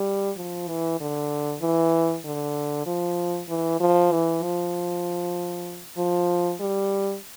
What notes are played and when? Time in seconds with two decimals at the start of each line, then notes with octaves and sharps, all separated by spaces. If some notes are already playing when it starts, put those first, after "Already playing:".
Already playing: G3
0.37 F3
0.68 E3
1.00 D3
1.61 E3
2.25 D3
2.86 F3
3.49 E3
3.80 F3
4.12 E3
4.43 F3
5.97 F3
6.60 G3